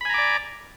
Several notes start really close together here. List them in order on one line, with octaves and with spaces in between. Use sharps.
B5 G#5 A#5 D6 D5